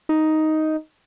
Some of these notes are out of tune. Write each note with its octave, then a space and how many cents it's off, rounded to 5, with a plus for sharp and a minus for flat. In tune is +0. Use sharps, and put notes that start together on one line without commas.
D#4 +5